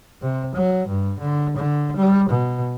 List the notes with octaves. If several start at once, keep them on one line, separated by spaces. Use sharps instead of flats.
C3
F#3
G2
D3
D3
G3
B2